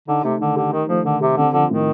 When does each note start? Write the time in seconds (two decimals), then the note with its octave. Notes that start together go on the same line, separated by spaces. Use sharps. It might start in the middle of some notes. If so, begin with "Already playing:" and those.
0.08 D3 D#4
0.24 C3 A3
0.40 D3 D#3
0.56 D3 G4
0.72 D#3 D#4
0.89 F3 A3
1.05 D3 D#3
1.21 C3 G4
1.37 D3 C4
1.53 D3 F3
1.70 A2 D#3